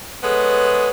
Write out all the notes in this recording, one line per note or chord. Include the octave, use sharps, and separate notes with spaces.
G#3 B3 A4 C#5